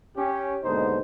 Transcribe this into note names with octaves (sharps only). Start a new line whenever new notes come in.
C#4 G4
D#2 G#2 B2 D3 D#4 C5